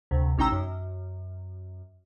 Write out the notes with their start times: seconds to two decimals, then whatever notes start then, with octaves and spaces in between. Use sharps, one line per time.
0.11 D2 C3
0.38 A1 C#4 D#4 G5 A#5 E6
0.52 F#2